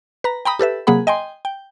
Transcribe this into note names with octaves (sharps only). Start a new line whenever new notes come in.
B4 A#5
G5 A#5 B5 D#6
G4 A4 B4 E5
C3 F#3 A#3 G#4 F#5 B5
D#5 G5 G#5 C6
G5